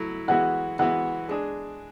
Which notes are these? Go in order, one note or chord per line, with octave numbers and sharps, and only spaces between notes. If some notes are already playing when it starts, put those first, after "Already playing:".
Already playing: F#3 A3 E4
E3 G#3 B3 F#4 F#5
E3 G#3 B3 F#4 F#5
G#3 D4 G#4